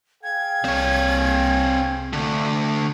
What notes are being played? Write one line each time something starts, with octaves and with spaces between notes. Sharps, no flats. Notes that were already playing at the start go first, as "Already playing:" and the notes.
G#4 F5 G5 G#6
C2 C4 C#5
D3 A3